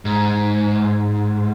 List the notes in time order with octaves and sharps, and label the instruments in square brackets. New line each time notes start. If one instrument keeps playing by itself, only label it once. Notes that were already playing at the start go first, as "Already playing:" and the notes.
[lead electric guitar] G#2